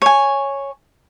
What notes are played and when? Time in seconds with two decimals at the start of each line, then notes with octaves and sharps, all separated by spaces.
0.02 C#5 G#5